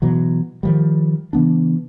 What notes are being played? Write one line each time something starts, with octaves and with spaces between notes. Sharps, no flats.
B2 E3 F#3
D#3 F3 G3
C#3 E3 B3 D4